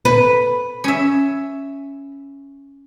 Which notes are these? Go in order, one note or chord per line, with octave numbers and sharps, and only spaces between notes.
B4
C#4 E5